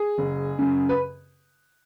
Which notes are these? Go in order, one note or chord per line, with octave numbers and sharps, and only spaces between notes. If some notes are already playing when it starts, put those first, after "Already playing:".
Already playing: G#4
F#1
F#2 C#3
B4